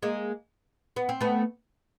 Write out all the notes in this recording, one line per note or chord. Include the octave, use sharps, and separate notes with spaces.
G#3 A#3
B3
C4
A3 B3